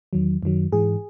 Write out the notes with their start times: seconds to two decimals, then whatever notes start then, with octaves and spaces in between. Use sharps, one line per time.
0.13 E2 D#3 F#3
0.43 F#2 D#3 F#3
0.72 G#2 E3 G#4